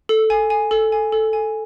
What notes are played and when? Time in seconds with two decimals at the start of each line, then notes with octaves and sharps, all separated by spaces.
0.09 A4
0.30 G#5
0.50 G#5
0.71 A4
0.92 G#5
1.12 A4
1.33 G#5